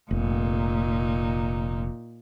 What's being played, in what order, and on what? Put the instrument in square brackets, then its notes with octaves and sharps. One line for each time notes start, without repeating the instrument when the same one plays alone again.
[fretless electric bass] F1 [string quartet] A#2 D#4